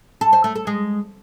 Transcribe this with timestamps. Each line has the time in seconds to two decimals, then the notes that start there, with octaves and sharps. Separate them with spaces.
0.21 A4
0.33 C5
0.44 A3
0.55 A4
0.67 G#3